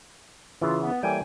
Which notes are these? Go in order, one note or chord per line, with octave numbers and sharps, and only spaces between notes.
C#3 E3 F4
B3
A2 E3 G3 A#3 G5 G#5